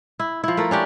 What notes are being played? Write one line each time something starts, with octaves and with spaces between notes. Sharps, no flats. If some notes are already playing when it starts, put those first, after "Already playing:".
E4
F3 E4
A3 A#4
C#4 D4 G4